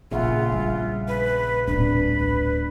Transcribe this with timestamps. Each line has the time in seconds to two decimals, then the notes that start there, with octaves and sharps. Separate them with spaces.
0.11 A#1 A#2 C#3 F4 G#4 E5 F#5
0.52 G3
1.08 B4
1.67 D1 B2 G3 D4 B4